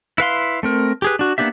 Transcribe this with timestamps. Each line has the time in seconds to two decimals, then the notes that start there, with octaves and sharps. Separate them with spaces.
0.18 E4 B4 F5 C6
0.63 A3 C4 A#4
1.02 G4 G#4 B4
1.19 D4 F#4
1.38 A#3 B3 D4 G4 E5